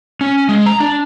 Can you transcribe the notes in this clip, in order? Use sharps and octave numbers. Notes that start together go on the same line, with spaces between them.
C#4
G#3
A#5
D4